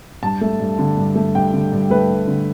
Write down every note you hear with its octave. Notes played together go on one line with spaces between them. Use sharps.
G2 A5
A3
G2
D3
G2
A3
G2 G5
D3
G2
A3 B4
G2
D3